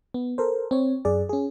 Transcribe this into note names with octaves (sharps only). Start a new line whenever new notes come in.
B3
A4 A#4 C5
C4 C#5
F#2 G#4 D5
C#4 G#4